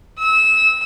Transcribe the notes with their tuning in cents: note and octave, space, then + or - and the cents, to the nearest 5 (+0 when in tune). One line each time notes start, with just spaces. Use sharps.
E6 -20